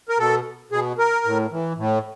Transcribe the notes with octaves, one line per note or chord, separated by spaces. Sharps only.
A#4
B2 A4
B2 G#4
A#4
A2
E3
A2